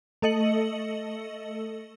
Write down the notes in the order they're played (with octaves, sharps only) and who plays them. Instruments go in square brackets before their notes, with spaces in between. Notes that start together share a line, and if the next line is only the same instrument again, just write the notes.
[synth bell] A3 A4 D#5 C#7 F#7